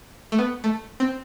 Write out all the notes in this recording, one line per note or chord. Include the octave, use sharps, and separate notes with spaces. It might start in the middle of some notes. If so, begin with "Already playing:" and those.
A3
B3
A3
C4